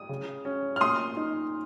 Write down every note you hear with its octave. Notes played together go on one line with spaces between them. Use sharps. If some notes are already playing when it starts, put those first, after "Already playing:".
Already playing: D#6
C#3
C#4
F6
A#2 C6 D#6
D#4